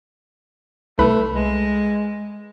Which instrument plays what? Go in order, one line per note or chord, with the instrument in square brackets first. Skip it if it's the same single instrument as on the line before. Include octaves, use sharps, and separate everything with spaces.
[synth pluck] C2 B4 B5 [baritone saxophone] A3
[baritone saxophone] G#3